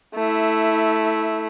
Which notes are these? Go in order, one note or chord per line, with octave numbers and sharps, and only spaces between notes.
A3 E4